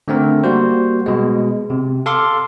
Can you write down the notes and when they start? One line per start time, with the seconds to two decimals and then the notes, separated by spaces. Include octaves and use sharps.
0.08 D3 A3 C4 A#4
0.44 G3 A#3 F#4 C5
1.06 B2 G#3
1.70 C3
2.06 A4 F5 C6 D6